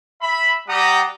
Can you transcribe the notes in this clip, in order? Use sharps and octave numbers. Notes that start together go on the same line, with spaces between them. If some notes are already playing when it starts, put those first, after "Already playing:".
E5 B5
G3 G4 F#5 A#5 D#6